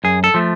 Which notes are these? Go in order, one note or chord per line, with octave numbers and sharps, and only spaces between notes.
F#2 G#4
A4
F3 A3